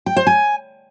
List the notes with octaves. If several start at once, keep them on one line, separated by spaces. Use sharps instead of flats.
G5
C5
G#5